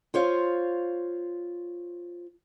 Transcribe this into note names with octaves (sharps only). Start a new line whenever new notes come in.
F4 C5 C#5 F5